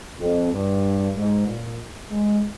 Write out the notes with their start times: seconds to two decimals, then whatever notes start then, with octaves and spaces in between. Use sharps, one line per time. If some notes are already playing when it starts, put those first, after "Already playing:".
0.20 F2
0.53 G2
1.16 G#2
1.48 A#2
2.12 G#3